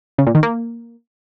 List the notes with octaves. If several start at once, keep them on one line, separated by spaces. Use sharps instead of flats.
C#3
A#2
D#3
A#3